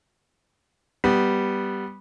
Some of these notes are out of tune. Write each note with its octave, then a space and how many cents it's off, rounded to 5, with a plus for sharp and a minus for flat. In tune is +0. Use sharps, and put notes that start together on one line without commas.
G3 +0 B3 +0